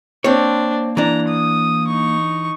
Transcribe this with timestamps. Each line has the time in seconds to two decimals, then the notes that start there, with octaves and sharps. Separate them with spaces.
0.24 A#3 C4 D4 C#5
0.97 E3 D4 A#5
1.28 D#6
1.87 D#4 C#6